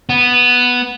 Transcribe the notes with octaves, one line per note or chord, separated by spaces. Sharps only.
B3